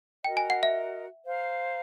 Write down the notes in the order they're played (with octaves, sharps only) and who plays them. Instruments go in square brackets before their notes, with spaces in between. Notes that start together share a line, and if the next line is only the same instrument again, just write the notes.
[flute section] F#4 A#4 D#5 [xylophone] G5
[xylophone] G#5
F#5
E5
[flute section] C5 F5 A#5